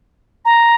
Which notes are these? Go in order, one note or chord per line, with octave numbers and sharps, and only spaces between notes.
A#5